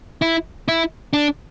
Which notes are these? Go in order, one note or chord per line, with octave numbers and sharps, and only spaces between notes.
E4
E4
D4